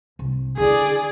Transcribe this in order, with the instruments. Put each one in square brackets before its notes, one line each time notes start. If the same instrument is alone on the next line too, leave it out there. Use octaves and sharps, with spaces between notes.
[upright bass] C2
[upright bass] D3 E4 [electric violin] G#4 D5